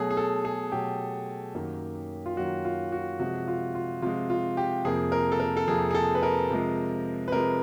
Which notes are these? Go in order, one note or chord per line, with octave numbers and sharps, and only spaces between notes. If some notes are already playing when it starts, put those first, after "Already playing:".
Already playing: B2 F#3 A3 G#4
G#4
A4
G#4
B2 F#3 A3 G4
F#2 D#3 F#3 A#3
F4
F#2 D#3 F#3 A#3 F#4
F4
F#4
C3 F3 G#3 F#4
F4
F4
C3 F3 G#3 F4
F4
G4
F2 C3 F3 A#3 G#4
A#4
A4
A#4
A4
F2 C3 F3 A#3 G#4
G#4
A4
B4
A#4
C3 F3 G#3
B4
C3 F3 G#3 A#4